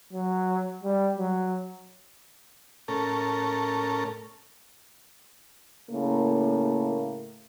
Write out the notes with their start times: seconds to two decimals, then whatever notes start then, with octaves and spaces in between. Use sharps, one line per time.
0.13 F#3
0.84 G3
1.18 F#3
2.88 A2 C#4 A4 A#4
5.90 A2 C#3 A#3